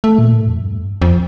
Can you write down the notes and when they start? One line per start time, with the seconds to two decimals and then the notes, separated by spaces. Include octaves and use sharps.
0.04 A3
0.19 A#2
0.34 A2
0.48 F2
0.63 G2
1.02 F2